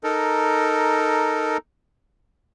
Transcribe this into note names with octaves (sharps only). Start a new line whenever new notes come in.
D#4 A4 A#4